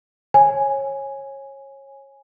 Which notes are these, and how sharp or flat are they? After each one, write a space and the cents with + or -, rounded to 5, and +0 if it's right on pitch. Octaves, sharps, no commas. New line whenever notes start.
C#5 -25 G#5 +0